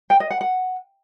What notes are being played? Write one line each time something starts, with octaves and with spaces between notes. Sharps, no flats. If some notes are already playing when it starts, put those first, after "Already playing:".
G5
D#5
F#5
F#5